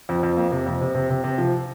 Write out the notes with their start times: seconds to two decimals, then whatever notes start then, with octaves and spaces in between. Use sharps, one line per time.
0.09 F2
0.23 F2
0.37 A#3
0.52 C3
0.66 F2
0.81 C3
0.95 C3
1.10 C3
1.24 C3
1.38 F3